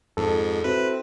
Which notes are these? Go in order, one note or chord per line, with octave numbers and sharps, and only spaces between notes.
F2 G#2 A4
C4 E4 F#4 B4